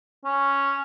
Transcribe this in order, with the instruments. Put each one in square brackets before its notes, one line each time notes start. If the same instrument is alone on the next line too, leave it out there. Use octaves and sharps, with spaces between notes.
[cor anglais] C#4